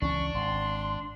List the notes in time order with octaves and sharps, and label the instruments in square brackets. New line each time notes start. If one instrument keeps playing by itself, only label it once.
[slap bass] C#2 E3 C#4 [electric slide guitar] D4 [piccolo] C#6
[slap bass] G#1 [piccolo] C6